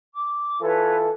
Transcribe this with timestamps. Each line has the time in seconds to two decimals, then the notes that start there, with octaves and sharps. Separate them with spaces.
0.14 D6
0.61 E3 F4 A4 B4 C#5